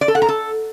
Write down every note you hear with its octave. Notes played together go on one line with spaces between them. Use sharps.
D5
A4
F#5
A#5
A4